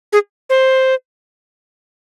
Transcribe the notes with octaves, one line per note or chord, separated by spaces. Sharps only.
G#4
C5